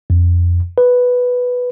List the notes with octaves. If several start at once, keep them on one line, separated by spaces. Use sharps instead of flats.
F2
B4